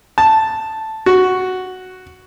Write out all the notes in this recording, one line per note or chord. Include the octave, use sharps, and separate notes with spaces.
A5
F#4